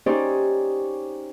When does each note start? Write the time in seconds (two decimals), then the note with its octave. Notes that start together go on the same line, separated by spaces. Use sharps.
0.06 C#4 D#4 G4 G#4 C5 D5